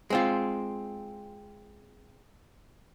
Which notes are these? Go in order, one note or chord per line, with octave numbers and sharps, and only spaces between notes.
G#3 C4 F4